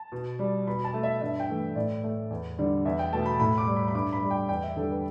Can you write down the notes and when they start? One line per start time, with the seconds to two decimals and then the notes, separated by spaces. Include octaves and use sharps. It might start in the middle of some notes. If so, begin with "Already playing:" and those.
Already playing: A5
0.12 B2
0.39 G3
0.67 B2 B5
0.84 A5
0.94 A3
1.03 E5
1.21 G2 E5
1.40 G5
1.49 E3 A3
1.76 A2 D5
2.03 A3
2.30 E2
2.58 D3 G3
2.85 E2 E5
2.99 G5
3.13 B2 A3 A5
3.26 B5
3.40 A2 B5
3.58 D6
3.67 G3
3.76 B5
3.88 B5
3.94 G2 D6
4.13 B5
4.22 G3
4.30 G5
4.49 E2 G5
4.63 E5
4.76 D3 G3 A4
4.90 B4